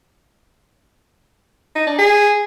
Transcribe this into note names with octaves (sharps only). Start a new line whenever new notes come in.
D#4
D4
G#4